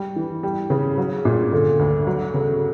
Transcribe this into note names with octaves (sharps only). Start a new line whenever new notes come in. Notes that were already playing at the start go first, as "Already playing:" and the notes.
Already playing: G3
E3
G3
C#3
F#3
A#2
D3
D2
F#3
C#3